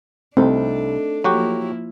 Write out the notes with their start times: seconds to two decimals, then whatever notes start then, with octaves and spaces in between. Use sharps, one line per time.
0.37 C2 A3 C4 D4 D#4 A4
1.24 F3 F#3 A#3 E4 F#4 G4